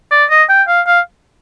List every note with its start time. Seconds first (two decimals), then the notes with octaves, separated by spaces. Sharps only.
0.12 D5
0.30 D#5
0.49 G5
0.68 F5
0.87 F5